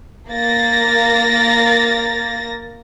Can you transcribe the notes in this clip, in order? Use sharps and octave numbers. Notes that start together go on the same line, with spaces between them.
A#3 A6 A#6